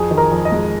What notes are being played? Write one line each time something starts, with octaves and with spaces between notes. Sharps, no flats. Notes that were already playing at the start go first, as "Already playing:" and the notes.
Already playing: F2 G#4 G#5
D#3
A#4 A#5
F2
D#5
G#3